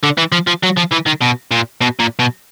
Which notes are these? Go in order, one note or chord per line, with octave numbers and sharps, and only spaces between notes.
D3
E3
F3
F3
F#3
F3
E3
D#3
B2
A#2
B2
A#2
B2